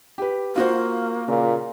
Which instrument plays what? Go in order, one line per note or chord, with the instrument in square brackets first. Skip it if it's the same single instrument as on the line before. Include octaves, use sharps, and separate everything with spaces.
[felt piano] G4 B4
[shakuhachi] A#3 [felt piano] F4 F#4 C5
[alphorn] A#2 [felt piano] C#3